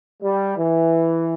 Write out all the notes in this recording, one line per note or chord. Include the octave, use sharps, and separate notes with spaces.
G3
E3